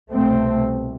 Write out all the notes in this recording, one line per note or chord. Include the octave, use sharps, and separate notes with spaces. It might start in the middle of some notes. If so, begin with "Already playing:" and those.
C2 B2 A3 C4